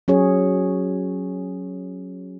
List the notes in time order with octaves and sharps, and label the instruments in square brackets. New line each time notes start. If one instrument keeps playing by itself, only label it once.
[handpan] F#3 C#4 G#4 C#5